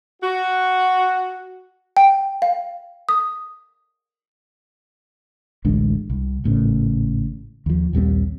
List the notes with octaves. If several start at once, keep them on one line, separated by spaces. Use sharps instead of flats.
F#4
G5
F5
D#6
A1 D2 G#3 D4
C2
G#1 A2 C#3
D#2 F3
A#1 D#2 G3 C4